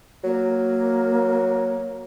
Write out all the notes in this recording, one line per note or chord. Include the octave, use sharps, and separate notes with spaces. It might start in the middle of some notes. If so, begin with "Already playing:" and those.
F#3 A#3